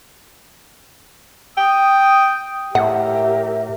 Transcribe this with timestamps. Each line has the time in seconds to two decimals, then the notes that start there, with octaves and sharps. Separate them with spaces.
1.58 G5 D#6
2.75 A2 G4 A#4 E5 F#5